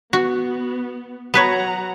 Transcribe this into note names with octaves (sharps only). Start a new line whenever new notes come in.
B3 F#4
F#3 B3 B4 C#5 F#5 A#5